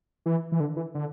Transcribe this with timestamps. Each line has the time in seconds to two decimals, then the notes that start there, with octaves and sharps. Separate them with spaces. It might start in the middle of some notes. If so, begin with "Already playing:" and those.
0.26 E3
0.52 E3
0.60 D3
0.76 E3
0.95 D3